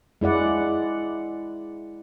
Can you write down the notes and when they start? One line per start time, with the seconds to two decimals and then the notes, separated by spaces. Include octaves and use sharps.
0.21 G#3 E4 D5 F#5